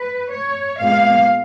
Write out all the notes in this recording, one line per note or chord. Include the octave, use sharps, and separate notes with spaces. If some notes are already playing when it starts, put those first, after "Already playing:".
Already playing: B4
C#5
A#2 G#3 B3 F5